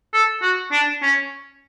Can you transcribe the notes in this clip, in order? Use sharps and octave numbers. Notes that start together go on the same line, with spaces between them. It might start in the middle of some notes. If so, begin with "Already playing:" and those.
A4
F#4
D4
C#4